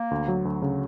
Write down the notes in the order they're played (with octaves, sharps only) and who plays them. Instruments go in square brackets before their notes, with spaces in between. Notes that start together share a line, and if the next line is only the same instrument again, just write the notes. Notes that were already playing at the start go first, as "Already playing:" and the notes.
Already playing: [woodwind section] A#3
[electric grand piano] D2
F#3
D2
C#3